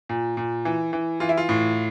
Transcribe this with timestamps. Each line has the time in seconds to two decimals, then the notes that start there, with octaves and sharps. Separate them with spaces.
0.09 A#2
0.37 A#2
0.65 E3
0.93 E3
1.20 E3 F4
1.29 E4
1.38 F4
1.49 A2